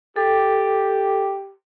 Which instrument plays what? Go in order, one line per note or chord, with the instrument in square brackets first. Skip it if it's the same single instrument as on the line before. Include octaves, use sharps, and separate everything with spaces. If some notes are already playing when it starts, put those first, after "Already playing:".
[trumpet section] G4 [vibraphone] A4